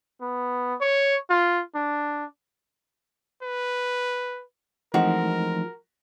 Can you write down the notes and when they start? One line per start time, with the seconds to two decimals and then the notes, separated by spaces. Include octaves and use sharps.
0.21 B3
0.81 C#5
1.30 F4
1.75 D4
3.43 B4
4.94 E3 F3 G#3 A3 C4 D#4 F#4 A#4